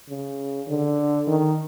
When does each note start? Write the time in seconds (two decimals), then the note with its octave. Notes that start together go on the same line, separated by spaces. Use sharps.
0.09 C#3
0.68 D3
1.27 D#3